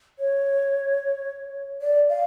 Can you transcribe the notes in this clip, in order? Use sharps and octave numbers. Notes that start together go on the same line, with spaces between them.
C#5
D5
F5